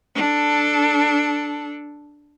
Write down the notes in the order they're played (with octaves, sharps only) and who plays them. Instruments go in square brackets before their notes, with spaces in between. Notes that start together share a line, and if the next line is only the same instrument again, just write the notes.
[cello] D4 A4